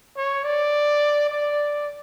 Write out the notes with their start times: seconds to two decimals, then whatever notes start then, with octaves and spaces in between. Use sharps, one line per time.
0.17 C#5
0.44 D5
1.30 D5